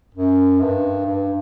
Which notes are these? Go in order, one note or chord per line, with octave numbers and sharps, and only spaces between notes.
F#2
G2
G2